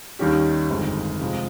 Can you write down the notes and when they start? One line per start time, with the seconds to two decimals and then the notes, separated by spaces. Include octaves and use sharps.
0.19 D#2 D#3 G3 C#4 G4
0.70 G1 F2 D#3 G#3
1.21 C3 F3 G#3